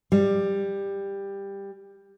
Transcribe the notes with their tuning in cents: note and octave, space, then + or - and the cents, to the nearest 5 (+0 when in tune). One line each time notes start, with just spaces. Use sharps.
G3 +15